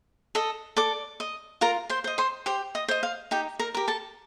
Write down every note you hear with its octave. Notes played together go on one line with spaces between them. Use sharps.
A4 D#5
A4 D5 D6
D#5
F4 A#4 A#5
C5 C6
C5 D#5
C5 C6
G4 C5 C6
D#5 D#6
C5 D#5
F5
D#4 G4 G5
A#4 A#5
G4 A#4
A4 A5